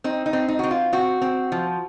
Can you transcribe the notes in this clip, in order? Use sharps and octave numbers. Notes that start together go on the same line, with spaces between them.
C4 D#4
D#4
C4
D#4
C4 F#4
F4
C4 F#4
C4
F3